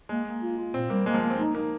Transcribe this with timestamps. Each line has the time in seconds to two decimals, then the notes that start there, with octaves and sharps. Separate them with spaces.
0.09 G#3 A#3
0.26 A#3
0.43 F4
0.57 F4
0.74 A#2 C4
0.90 G3 A#3
1.06 G#3 A#3
1.14 F3
1.22 A#3
1.30 C4
1.39 D#4
1.55 A#3 D#4